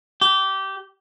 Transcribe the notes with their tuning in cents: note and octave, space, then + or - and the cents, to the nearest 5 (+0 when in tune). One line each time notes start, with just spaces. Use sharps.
G4 -20